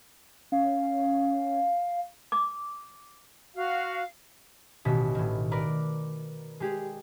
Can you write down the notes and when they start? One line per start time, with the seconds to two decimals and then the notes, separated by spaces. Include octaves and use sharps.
0.52 C#4 F5
2.32 D6
3.55 F#4 F5
4.85 A1 B2 D#3 B6
5.15 A2 D#3
5.52 A#4 B4 D5
6.60 G#3 G4 G#4